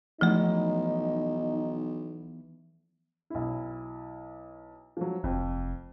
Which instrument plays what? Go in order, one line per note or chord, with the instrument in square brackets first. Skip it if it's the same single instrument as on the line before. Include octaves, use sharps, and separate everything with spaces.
[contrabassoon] B1 [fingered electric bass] E3 B3 [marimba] F3 A3 [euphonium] D#4
[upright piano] B1 E4
F3 F#3
[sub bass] F1 [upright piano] F2